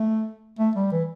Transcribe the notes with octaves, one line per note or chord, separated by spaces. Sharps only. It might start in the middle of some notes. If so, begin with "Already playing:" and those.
Already playing: A3
A3
G3
E3